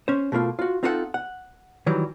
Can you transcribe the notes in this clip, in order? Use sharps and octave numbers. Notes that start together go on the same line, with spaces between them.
C#4 C5
B2 A3 A#3 F4
F4 F#4
C4 D#4 F4 A4 D#5 F#5
F#5
D#3 E3 F#3 G3